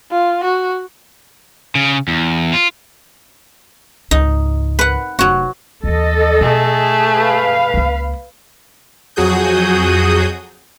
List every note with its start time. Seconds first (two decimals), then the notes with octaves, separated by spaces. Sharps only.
0.11 F4
0.44 F#4
1.75 C#3
2.08 E2
2.53 F4
4.11 C#2 G#2 D#4
4.79 B4 F#5
5.19 F1 F#3 F#4
5.84 D#2 E3 A4 D#5
6.41 B2 A3 G#4
7.08 B4 F5
7.74 C#2 A#3
9.16 F2 F#3 F#4 G#4 D#6 G6